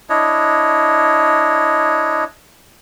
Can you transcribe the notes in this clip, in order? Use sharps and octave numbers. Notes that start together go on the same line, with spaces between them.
D4 E4 C#5 D#5